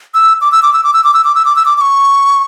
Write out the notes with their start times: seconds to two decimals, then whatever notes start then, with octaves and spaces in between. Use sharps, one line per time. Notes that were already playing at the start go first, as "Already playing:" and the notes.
0.14 E6
0.41 D6
0.52 E6
0.63 D6
0.73 E6
0.84 D6
0.93 E6
1.04 D6
1.14 E6
1.24 D6
1.35 E6
1.45 D6
1.56 E6
1.65 D6
1.78 D6
1.81 C#6